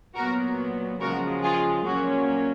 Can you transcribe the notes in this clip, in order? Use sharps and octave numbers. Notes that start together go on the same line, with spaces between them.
A#2 F#3 B3 F#4 A#4
C#3 F3 G#3 F#4 A#4
F4 G#4
A#2 F#3 A#3 C#4 F#4